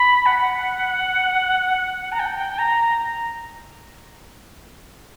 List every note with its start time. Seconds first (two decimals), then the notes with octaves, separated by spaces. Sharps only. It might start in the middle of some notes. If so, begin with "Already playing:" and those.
Already playing: B5
0.26 F#5
2.12 A#5
2.19 G5
2.58 A#5